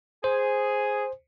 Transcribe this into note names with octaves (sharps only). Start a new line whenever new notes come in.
G#4 C5